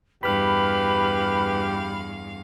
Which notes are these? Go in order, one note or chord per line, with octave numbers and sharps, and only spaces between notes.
E2 G2 G4 B4 F5 B5 F6